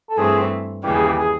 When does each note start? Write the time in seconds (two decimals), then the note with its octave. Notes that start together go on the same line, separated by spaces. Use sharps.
0.09 A4
0.17 G2 E3 A3 C4 G#4
0.84 D#2 C#3 E3 G3 G4
0.95 G#4
1.06 G4
1.18 G#4